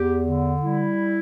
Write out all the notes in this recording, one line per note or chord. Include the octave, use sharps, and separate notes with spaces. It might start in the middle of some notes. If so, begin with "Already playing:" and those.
Already playing: E2 G4
D3
G3 E4